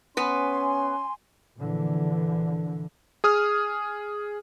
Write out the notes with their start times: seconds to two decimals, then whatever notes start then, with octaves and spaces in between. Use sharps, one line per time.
0.17 B3 C#4 B4 G#5 C6
1.56 A#1 D3 E3
3.24 G#4 D#6 F6